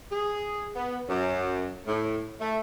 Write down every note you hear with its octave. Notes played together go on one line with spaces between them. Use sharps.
G#4
B3
F#2
A2
A3